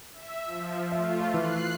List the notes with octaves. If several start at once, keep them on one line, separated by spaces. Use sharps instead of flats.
E5
F3
A3 F4 E5
E3 F#6 C7